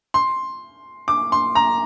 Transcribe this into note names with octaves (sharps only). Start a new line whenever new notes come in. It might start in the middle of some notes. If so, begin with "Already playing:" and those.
C6
D6
C6
A#5